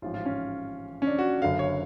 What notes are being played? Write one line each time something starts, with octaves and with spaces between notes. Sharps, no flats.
A1 G#2 F3 F4
F4
C#4
C#4
D4
F#4
F#1 F#2 D3 F5
C#5